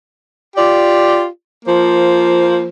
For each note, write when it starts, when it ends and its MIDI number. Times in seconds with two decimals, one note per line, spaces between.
0.57 1.24 65
0.57 1.24 67
0.57 1.24 74
1.66 2.68 53
1.66 2.68 58
1.66 2.68 72